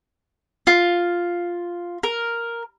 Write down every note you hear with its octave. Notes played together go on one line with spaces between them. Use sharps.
F4
A#4